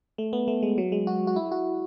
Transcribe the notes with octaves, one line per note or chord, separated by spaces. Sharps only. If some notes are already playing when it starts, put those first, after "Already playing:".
A3
B3
A3
G#3
F#3
G#3
F#4
F#4
E4
F#4